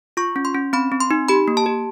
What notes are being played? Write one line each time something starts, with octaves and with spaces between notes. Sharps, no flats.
F4 C#6
C#4
C6
C#4
C4 B5
C4
C6
D#4
G4 B5
A#3
A5
G4